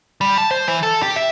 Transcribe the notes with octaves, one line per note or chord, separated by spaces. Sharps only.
G3
A5
C5
E3
A4
G4
E5